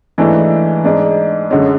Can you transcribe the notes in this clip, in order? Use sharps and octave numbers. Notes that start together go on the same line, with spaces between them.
G#2 E3 A3 D4
G#2 G#3 D4
F#2 D3 G#3 C#4